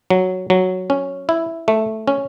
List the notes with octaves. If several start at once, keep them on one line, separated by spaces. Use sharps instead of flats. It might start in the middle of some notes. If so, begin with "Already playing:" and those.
F#3
F#3
C#4
E4
A3
C#4